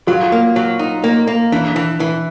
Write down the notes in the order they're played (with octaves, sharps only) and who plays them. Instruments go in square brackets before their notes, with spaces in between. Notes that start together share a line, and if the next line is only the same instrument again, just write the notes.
[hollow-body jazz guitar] F#3 [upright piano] F4
[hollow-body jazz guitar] A#3
F#3
D#4
A#3
A#3
[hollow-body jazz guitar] E3 [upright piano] D4
[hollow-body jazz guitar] E3
E3